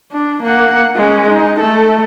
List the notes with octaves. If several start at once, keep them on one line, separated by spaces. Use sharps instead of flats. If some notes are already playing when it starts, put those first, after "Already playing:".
D4
A#3 F#5
G#3 C#4
D#4
A3 A4